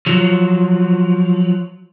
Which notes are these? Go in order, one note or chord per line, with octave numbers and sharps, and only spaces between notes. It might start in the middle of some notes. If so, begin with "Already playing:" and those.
F3 F#3